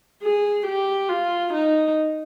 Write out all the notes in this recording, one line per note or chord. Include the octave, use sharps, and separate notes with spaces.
G#4
G4
F4
D#4